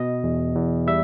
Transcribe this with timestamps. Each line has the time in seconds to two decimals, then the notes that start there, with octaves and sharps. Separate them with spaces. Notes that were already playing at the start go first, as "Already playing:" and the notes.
Already playing: B2 D#5
0.24 E2
0.55 E2
0.87 G3 E5